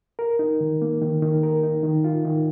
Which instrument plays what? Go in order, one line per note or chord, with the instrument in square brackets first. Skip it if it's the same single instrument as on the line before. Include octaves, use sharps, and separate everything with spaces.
[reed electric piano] A#4
D#4
D#3
A#3
D#3
D#3
A#4
D#4
D#3
F4
D#3